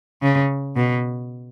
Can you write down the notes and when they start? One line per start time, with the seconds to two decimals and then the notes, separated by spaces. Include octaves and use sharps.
0.22 C#3
0.76 B2